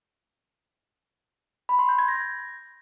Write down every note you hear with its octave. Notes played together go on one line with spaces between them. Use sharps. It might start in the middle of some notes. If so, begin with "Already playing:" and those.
B5
C6
G6
G#6
A#6